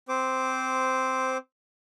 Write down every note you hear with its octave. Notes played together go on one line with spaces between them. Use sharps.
C4 C5 D6